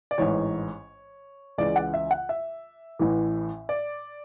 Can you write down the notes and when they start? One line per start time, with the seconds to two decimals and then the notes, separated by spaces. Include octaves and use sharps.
0.11 D5
0.18 A1 G#2 E3 C#5
1.58 C#2 C#3 E3 D5
1.76 F#5
1.94 E5
2.11 F#5
2.29 E5
2.99 A1 A2 E3
3.69 D5